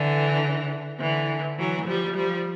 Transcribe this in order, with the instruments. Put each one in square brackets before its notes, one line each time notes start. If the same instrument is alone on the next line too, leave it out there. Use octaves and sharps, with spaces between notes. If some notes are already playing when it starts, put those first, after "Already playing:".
Already playing: [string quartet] D3 E3
D3 E3
E3 F#3
F3 G3
F3 G3